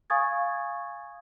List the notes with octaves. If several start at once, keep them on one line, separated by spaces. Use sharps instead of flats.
F5 G#5 C#6 D#6 G#6 A6